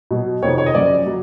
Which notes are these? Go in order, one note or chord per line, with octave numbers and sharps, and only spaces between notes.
B2 F#3
F2 C3 D#3 C#5
C#5
D#5
F#2 C#3 F3 D5
F#3